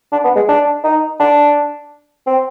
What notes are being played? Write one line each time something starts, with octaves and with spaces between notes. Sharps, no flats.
D4
B3
G#3
D4
D#4
D4
C4